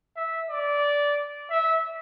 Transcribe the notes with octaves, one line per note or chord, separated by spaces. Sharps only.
E5
D5
E5